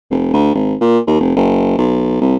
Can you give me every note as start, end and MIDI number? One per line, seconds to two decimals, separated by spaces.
0.11 0.33 29
0.34 0.51 38
0.55 0.75 32
0.81 0.99 46
1.07 1.20 39
1.20 1.32 29
1.36 1.77 30
1.78 2.21 35
2.21 2.37 36